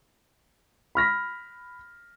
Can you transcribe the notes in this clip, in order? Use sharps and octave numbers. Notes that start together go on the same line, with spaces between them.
B5 F6 A#6 B6